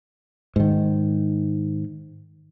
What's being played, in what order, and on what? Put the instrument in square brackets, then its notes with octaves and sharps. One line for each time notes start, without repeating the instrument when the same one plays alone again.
[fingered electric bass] G#2 D#3